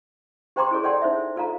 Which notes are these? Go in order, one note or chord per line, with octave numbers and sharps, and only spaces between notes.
G4 C5 G5 A#5 C6 D6
E4 G#4 A4 C#5
A4 C#5 D5 F#5 G5 C6
D#4 C5 C#5 E5
F4 A4 F5 A#5